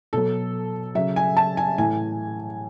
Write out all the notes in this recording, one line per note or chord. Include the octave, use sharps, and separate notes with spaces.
B2 F#3 A4
C#3 F#3 E5
G#5
A5
G#5
A2 E3 G#5